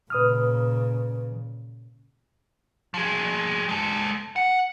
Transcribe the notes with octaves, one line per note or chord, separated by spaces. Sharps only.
A#2 C#3 B4 D#6 F6
F3 G#4
G#3 A4
F#5